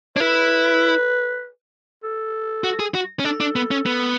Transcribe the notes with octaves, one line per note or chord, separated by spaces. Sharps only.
D4 C#5
E4 B4
A4
F#4
G#4
F#4
C#4
D4 A4
D4
B3
C#4
B3